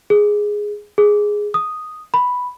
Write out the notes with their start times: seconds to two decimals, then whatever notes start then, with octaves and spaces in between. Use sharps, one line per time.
0.10 G#4
0.98 G#4
1.54 D#6
2.14 B5